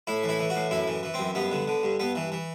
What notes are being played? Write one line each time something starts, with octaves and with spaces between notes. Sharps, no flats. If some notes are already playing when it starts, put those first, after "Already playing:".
A2 E4
E3
E4
E3
F#4
A2
F#2 E4
E3
E3
C4
F#2
G2 B3
D3
D3
G2
G2 B3
E3
E3